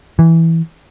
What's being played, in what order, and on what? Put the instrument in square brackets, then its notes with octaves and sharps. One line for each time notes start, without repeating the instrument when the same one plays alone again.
[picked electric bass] E3